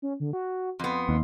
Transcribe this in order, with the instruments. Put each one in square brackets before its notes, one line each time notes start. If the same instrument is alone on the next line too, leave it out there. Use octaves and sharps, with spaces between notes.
[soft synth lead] C#4
D3
F#4
[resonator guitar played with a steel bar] F2 B3 [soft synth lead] C6
[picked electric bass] D#2